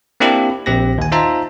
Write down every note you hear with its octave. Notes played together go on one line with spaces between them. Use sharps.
A#3 C4 D4 E4 G4
A#1 C4 G4 A#6
D#2 G#5
D#4 F4 C5 E5 A5 A#5